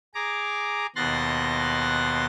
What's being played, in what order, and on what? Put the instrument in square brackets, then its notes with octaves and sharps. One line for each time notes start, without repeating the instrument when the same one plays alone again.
[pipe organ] G#4 A#5 D6
D#2 B2 C6 F#6 A6 A#6